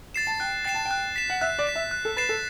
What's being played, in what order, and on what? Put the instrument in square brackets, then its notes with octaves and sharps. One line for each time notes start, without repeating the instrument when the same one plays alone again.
[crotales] A6 C7 E7
[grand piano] A5
[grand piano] G5 [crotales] F#6
[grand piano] G5 [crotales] A6 C7 E7
[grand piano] A5
G5
[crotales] F#6
B6 E7
[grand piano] F#5
[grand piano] E5 [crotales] F#6
[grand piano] D5
[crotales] B6 E7
[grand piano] E5
[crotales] F#6
[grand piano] A4
[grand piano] B4 [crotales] A6 C7 E7
[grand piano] A4